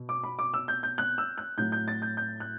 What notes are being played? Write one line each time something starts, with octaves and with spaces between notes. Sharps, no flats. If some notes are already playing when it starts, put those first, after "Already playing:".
Already playing: B2
D6
B5
D6
E6
G6
G6
F#6
E6
F#6
A2 F#3 G6
G6
A6
G6
G6
F#6